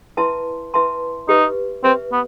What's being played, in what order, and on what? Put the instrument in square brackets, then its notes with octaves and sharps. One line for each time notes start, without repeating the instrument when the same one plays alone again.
[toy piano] E4 B4 E5 A5 C6
E4 B4 E5 A5 C6
[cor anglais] D#4 [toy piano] G4 B4 E5
[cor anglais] C4 [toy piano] G4 B4 E5
[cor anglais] B3